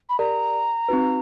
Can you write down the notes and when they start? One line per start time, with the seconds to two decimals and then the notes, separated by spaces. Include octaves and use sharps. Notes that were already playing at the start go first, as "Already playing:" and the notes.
0.09 B5
0.19 G4 A#4 D5 A#5
0.89 C4 D#4 F#4 B4